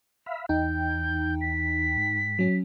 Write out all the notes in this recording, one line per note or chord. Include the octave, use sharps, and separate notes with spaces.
E5 F5 B5
E2 D#4 G5 G6
B6
G#2
F#3 C#4